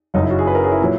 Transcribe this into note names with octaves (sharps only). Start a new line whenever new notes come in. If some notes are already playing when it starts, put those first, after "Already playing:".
F#1 F#2 C#3 D#4
E4
F#4
G#4
B4
A#4
G#4
E4
A#2 F#3